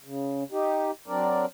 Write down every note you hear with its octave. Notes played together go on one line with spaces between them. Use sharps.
C#3
D#4 G4
F#3 C4 D4 A#4 D5